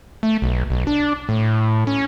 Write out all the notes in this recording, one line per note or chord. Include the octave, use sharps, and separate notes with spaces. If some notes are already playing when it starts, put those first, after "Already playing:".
A3
B1
B1
D4
A2
C#4